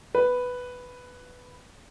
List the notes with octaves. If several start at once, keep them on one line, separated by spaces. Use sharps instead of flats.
B4